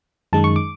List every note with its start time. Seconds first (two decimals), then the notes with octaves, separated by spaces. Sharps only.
0.33 F#2 D#3 G#3 A5
0.44 C#6
0.56 D6